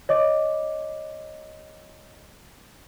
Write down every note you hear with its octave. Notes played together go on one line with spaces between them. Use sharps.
C#5 D#5 D6